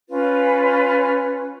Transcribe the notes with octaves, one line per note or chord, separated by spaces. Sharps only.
C#4 F4 B4